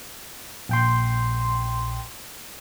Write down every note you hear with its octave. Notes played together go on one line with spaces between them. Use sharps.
A#1 G5 C6